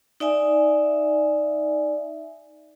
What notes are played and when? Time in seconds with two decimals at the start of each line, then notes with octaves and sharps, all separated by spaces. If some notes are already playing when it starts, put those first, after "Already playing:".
0.20 D#4 D5 E5 G#5